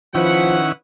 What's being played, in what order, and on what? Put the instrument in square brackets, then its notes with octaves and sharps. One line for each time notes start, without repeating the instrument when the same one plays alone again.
[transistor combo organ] D#3 C#4 E4 [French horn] F3 [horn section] B4 F#5